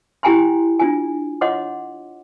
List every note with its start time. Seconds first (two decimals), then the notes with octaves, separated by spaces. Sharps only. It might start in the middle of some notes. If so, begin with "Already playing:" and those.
0.23 E4 G4 G5 G#5 A#5 C6
0.79 D4 F4 G#5
1.41 F4 C#5 D#5 F#5 C6 D6